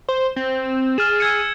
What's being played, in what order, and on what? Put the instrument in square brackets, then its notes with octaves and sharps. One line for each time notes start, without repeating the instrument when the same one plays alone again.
[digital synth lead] C5
C4
[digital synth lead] G#4 [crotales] F6 A6 E7
[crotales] E6 G#6 C#7